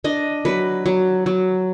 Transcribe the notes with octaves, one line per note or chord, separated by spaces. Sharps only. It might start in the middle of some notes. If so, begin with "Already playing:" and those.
D4 D#5
F#3 B4
F#3
F#3